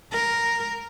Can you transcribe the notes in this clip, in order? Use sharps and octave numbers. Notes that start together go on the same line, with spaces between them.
A#4